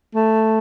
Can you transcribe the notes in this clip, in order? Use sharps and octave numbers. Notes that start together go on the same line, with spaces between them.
A3